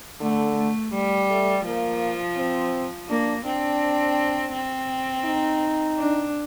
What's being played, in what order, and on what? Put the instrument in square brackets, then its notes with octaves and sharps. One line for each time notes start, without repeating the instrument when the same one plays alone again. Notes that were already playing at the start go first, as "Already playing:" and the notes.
[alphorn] D3 [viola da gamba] A3
[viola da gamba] A3
G3
[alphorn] A3
[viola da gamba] F3 [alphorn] A#3
[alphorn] C4
[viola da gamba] A#3 [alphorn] D4
[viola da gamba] C4 [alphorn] D4
[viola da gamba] C4
[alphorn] D#4
[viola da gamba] D4